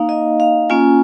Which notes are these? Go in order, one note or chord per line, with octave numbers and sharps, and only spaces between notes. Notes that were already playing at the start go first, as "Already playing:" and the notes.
Already playing: A#3 D#4 F5
D#5
F5
A#3 C#4 F4 G#5